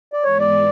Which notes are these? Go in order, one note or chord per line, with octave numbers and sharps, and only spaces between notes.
D5
G#2 E3 G#3 B3 C#5
D5